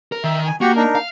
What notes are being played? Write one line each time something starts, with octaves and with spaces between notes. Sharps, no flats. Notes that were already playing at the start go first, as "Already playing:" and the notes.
A#4
D#3 E5
G#5
A#3 F#4 G4 C#6
D4 D#4 A#4
F5